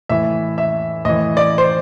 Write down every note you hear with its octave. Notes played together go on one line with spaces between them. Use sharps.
A2 E3 E5
E5
A2 E3 D#5
D5
C5